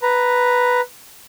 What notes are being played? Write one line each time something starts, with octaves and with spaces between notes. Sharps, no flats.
B4 A#5